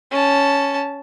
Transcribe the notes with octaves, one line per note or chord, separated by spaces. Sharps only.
C#4 A5